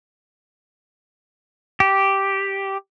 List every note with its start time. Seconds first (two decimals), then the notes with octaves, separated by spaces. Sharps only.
1.80 G4